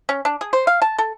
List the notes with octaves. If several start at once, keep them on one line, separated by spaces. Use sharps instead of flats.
C#4
D4
G#4
C5
F5
A5
A4